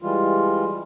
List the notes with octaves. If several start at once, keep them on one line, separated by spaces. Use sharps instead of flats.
E3 G3 G#3 F4